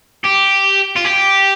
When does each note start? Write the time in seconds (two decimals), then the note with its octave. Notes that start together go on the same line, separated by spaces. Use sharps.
0.25 G4
0.97 F4
1.05 G4